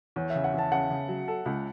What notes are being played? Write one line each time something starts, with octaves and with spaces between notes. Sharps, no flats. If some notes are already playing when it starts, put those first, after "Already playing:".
E2 C#5
E5
C#3
F#5
E2 A5
C#3 F#5
C#3
F#3
A4
C#2